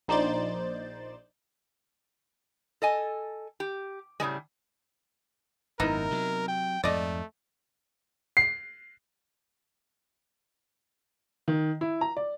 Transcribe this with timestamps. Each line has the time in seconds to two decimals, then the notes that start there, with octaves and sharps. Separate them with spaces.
0.08 A#1 D#4 C5 D5 G6 A6
2.82 A4 D#5 G#5
3.60 G4
4.20 A2 C#3 G3 G#3
5.80 G#1 F#2 B3 D#4 E4 A#4
6.11 C3 F#3
6.48 G5
6.84 F2 G#2 A3 D5 D#5
8.37 C7
11.48 D#3
11.81 E4
12.01 A#5
12.17 D5